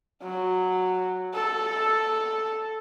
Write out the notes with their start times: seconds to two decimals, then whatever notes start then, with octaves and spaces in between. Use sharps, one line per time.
0.23 F#3
1.35 A4